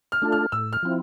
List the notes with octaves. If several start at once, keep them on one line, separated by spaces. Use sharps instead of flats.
F6
A3 D4 F4 A4
F6
A2 E6
F6
F3 C4 E4